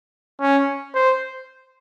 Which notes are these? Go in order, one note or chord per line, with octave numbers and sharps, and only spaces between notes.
C#4
C5